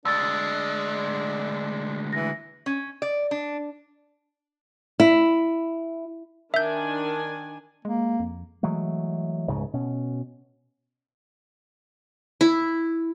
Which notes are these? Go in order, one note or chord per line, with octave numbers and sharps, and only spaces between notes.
D2 G#3 D4 E6 A6
E3 A#6
C#4
D5
D4
E4
D#3 D4 E5 G#5 G6
G#3 A#3
F2
E3 F#3 G#3 A3
F1 C#2 G#2 C#3
B2 C#4
E4